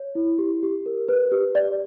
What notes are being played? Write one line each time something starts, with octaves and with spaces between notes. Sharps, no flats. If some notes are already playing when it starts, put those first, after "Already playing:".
Already playing: C#5
E4
G4
G4
A#4
B4
G4
D5